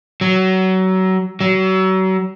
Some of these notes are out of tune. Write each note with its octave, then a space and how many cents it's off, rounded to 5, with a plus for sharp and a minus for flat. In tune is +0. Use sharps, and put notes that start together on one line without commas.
F#3 +25
F#3 +35